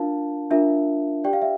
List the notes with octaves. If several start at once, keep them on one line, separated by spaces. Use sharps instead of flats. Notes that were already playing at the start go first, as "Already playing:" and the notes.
Already playing: D4 F4 A#4 F5 A5
D4 F4 A#4 E5
G4 D5 G5
F5
E5